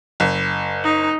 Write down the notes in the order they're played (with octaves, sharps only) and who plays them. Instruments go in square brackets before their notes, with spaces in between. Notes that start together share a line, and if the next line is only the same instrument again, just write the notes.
[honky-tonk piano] F#1
[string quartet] D#4